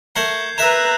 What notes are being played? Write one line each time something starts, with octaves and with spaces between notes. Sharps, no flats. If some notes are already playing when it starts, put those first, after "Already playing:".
A3 A#4 F#5 G6 G#6 C7
A#4 B4 E5 A#5 E6 F#6 E7